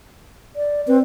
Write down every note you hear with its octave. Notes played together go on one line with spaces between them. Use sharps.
D5
C4 B4